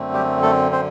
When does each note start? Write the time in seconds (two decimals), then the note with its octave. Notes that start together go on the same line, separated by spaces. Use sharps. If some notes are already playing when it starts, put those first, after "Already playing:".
Already playing: F#2 D3 A3 C4
0.14 G3 G4
0.42 A3 A4
0.72 C4 C5